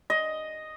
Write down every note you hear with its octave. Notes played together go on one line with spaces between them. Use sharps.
D#5